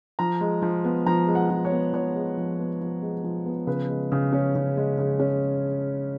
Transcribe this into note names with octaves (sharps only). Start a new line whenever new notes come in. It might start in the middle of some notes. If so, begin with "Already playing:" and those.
F3 A#5
G#3
F3
B3
F3 A#5
G#3
F#5
F3
C#5
B3
F3 C#5
G#3
F3
B3
F3
G#3
F3
B3
C#3 B4
G#3
C#3
C#4
C#3
G#3
C#3
C#4